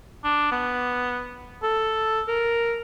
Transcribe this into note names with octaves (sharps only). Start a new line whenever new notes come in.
D4
B3
A4
A#4